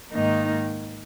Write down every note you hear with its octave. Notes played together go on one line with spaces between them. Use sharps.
G#2 D#3 A#3 D#4